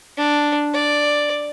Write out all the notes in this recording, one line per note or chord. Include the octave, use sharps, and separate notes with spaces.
D4
D5